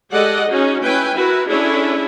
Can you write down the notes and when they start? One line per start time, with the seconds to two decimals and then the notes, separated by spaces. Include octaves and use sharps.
0.12 G#3 G4 A4 D5 D#5 F#5
0.49 C#4 D#4 F#4 G#4
0.84 C#4 E4 B4 G5 G#5
1.15 E4 F#4 A#4 B4
1.49 C#4 D4 E4 G#4 A4 C#5